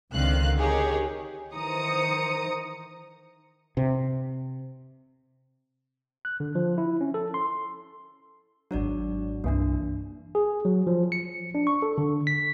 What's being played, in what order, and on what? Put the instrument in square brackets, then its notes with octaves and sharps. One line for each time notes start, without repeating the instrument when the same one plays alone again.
[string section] C#2 D3 D#3 C4 F5 F#6
D#4 G4 G#4 A#4 C#5
D#3 E3 C5 A#5 D#6 C#7
[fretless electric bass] C3
[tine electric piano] F#6
D3
F3
E4
C#4
A4
C6
[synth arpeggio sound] G#1 F#3 [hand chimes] D4 C#5 D5
[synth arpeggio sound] C2 G2 E3 [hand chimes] A#3 D4
[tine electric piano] G#4
F#3
F3
C#7
D4
C#6
A4
D3
B6